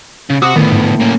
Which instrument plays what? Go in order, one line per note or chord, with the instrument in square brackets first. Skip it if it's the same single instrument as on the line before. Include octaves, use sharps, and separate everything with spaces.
[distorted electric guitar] C#3
[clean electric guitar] C3 [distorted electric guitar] F#4 F#5 [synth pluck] D6 D#6
[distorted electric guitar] D2 B3 [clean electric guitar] A2 [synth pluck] D#3
[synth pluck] G#2
[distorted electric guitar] A#3 C#4